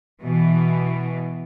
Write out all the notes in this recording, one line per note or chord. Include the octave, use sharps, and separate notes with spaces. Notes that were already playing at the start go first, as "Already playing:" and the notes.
B2 E3